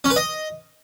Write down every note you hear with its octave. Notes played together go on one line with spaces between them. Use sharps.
C#4
B4
D#5